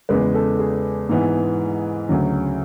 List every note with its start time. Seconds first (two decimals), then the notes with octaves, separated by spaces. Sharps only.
0.09 E2 C#3 G#3 B4
0.35 A4
0.59 G#4
1.09 G#2 E3 B3
2.09 D2 C#3 F#3